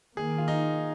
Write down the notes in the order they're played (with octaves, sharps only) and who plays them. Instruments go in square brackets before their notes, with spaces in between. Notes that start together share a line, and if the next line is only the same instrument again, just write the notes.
[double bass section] D#3 A#3 [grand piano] G#4
[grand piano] F4
D#4